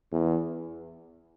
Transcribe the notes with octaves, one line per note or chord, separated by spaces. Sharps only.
E2